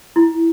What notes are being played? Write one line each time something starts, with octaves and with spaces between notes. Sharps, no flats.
E4